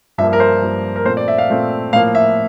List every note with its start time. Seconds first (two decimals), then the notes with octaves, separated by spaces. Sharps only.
0.18 G2 F3 A#3 E5
0.33 A#4
0.40 C5
0.62 G2 F3 A#3
0.96 A#4
1.05 A#2 A3 C4 C5
1.17 D5
1.28 E5
1.38 F5
1.50 A#2 A3 C4
1.93 A2 F3 A#3 F5
2.15 E5